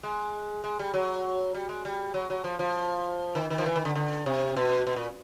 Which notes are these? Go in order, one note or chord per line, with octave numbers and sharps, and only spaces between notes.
G#3
G#3
G3
F#3
G3
G#3
G3
F#3
F#3
F3
F3
D#3
D#3
F3
E3
D#3
D3
D3
C3
B2
B2
A#2